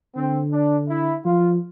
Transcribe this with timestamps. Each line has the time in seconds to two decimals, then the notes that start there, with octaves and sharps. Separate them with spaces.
0.15 D3 C4
0.52 D4
0.89 E4
1.25 F3 F4